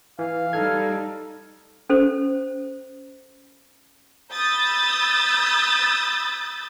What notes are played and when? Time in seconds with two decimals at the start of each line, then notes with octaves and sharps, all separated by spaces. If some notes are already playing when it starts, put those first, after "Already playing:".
0.19 E3 F5
0.53 G3 D#4 A4 F6 G#6
1.90 C#4 A4 C5
4.32 B5 D#6 E6 G6 A6